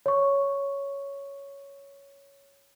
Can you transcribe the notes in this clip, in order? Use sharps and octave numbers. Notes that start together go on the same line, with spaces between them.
C#5 C#6